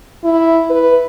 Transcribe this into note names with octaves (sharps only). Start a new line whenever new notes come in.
E4
B4